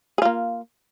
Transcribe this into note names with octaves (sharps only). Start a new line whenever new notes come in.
A#3 F4 G#4